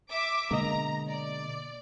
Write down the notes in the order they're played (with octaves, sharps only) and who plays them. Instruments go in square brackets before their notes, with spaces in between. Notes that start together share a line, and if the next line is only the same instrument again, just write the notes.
[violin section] E5 D6
[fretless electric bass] B2 D3 G#3 [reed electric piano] A#3 D#5 [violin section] A#5
[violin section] D5